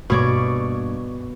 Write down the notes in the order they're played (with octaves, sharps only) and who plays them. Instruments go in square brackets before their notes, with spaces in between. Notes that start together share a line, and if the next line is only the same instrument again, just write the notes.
[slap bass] G2 A#3 [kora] B2 C#5 D5